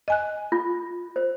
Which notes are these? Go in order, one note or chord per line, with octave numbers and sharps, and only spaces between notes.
D#5 G#5 F#6
F4
C5